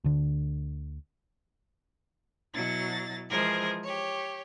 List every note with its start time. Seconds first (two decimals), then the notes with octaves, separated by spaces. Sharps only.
0.04 D2 D3
2.54 B2 F#3 E4 A6 A#6
3.30 E3 F3 G#3 G#4 A#4 C5
3.83 G4 C#5